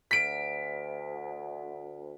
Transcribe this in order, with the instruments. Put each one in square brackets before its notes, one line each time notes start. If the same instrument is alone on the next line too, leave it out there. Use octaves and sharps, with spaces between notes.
[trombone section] D2 [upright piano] B6 D7